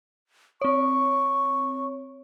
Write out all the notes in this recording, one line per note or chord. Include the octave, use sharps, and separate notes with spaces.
C4 C#5 C#6